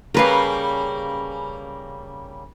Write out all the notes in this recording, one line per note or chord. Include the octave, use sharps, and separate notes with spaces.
C#3 G3 A#3 A#4 B4 F5